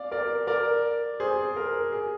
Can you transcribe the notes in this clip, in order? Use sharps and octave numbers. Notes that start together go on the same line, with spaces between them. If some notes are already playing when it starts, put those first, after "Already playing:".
Already playing: D5 F5
A#4 D5
A#4 D5
G#4 C5
A#4
G#4